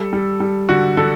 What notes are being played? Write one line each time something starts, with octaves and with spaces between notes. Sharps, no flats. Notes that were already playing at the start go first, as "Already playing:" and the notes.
Already playing: G3 A4
G3
G3
D3 F#4
D3 A4